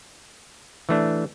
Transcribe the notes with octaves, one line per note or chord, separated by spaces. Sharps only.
E3 A3 D4